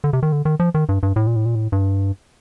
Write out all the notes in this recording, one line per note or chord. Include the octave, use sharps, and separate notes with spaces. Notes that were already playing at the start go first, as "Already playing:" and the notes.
D3
C3
D#3
D3
D#3
F3
D#3
G2
G2
A2
A#2
A2
A#2
A2
G2